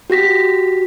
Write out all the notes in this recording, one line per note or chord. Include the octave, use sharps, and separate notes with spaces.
F#4 G4 A#6 B6